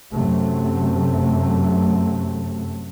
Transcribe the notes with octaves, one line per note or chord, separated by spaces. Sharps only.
F#2 C3 F#3 A3